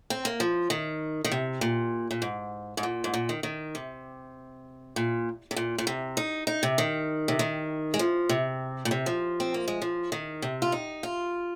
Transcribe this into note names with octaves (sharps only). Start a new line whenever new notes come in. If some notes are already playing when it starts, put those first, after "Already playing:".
C4
A#3
F3
D#3
D#3
C3
A#2
A#2
G#2
G#2
A#2
G#2
A#2
D#3
D#3
C3
A#2
C3
A#2
A#2
C3
D#4
D#4
C3
D#3
C3
D#3
G#3
F3
C3
A#2
C3
F3
C4
A#3
G#3
F3
D#3
C3
F4
D#4
F4